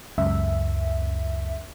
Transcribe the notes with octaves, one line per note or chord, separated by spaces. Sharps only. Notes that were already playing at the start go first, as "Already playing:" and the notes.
C#2 F#2 E5